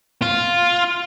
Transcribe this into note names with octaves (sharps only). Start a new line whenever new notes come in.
F4